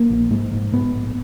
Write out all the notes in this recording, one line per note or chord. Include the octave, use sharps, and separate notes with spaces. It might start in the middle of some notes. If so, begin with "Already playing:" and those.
Already playing: A#3
A#1
G#2 G#3
G#2
G#2 B3
A#1